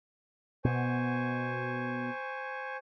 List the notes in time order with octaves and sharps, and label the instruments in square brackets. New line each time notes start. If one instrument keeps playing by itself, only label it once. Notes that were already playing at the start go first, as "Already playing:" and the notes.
[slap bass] B2 B3 [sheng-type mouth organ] C5 G#5 C#6